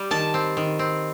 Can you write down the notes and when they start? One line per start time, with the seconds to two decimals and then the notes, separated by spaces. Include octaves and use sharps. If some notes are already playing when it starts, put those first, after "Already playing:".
Already playing: G3
0.11 D#3 A5
0.34 C4
0.57 D#3
0.79 C4